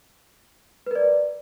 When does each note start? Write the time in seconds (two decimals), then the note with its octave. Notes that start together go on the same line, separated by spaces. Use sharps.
0.87 B4
0.91 A#4
0.96 D5